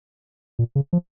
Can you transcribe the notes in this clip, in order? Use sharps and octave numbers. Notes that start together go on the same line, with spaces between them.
A#2
C#3
F3